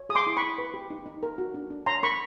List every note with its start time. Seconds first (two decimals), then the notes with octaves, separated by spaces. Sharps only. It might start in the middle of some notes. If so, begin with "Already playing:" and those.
Already playing: C#5
0.09 G#4 D#6
0.15 C6 D6
0.27 E4
0.37 B5 C#6
0.42 E4
0.58 B4
0.74 G4
0.90 D#4
1.06 D#4
1.23 A#4
1.38 F#4
1.54 D4
1.70 D4
1.86 C#5 A#5 C6
2.03 A#4 B5 C#6